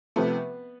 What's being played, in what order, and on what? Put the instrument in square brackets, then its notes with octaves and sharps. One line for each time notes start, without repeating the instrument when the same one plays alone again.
[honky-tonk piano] C3 F3 A3 [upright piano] B3 B4